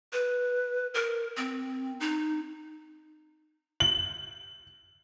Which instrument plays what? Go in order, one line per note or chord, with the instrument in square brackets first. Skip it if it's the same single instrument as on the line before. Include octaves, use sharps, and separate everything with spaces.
[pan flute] B4
A#4
C4
D#4
[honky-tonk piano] F#7